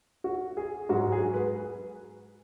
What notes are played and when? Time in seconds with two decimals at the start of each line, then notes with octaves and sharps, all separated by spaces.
0.24 F#4
0.57 G#4
0.89 G#2 F#3 F#4
1.12 G#4
1.34 B4